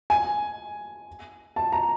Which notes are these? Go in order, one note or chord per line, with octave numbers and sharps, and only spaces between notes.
G#5
A5
A#5